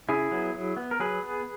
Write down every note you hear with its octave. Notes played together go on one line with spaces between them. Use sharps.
C#3 E4 G#4
F#3 B3
F#3
B3
A#4
F#3 G#4 B4
B3